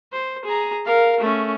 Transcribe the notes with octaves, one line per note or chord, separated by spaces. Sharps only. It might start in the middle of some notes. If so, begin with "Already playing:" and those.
C5
G#4 A#5
A#4 F5
A3 C#4